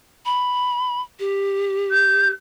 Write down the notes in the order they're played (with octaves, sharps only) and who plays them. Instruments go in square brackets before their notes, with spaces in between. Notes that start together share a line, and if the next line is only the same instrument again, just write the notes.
[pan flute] B5
G4
[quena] G6